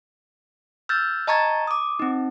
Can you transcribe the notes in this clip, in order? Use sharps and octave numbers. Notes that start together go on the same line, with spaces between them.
E6 F6 G6 A6
D#5 A5 A#5 C#6 G#6 A6
D6 D#6
C4 D#4